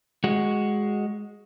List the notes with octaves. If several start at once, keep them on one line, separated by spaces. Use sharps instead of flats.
G#3 F#4